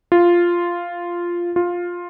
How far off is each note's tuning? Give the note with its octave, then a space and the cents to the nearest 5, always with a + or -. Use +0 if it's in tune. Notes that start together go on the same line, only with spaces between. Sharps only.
F4 -5
F4 +10